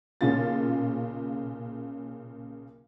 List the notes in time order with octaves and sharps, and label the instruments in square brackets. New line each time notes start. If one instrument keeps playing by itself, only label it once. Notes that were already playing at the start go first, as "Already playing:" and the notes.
[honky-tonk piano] B1 A#2 C#3 C#4 F4 A6